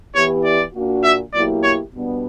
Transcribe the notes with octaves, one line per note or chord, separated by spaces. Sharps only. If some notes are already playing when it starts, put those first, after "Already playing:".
E3 B3 E4 G4 C#5
D5
A#2 A#3 D4 F#4
E5
B2 F#3 A#3 E4 G4 D5
C#5
B2 G3 B3 D4